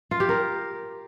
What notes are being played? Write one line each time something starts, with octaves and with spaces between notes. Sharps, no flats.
F4
G4
A#4